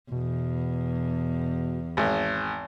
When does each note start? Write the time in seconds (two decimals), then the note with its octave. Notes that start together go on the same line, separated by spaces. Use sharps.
0.12 E2 B2
1.97 G#1